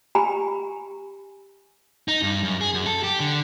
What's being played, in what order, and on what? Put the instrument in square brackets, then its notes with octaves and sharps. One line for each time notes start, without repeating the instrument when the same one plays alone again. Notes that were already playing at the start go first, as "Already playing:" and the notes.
[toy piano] G4 G#5 A#5 B5
[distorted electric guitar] D#4
G2
F#2
G#4
F#2
A4
G4
D3